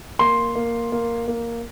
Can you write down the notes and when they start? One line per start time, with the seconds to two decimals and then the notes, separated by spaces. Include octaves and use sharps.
0.19 A#3 C6
0.55 A#3
0.92 A#3
1.28 A#3